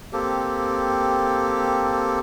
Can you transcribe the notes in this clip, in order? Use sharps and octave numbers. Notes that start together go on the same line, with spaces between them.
A#3 C4 G4 A4